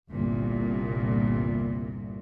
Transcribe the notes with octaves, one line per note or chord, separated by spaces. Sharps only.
G1 C2 A#2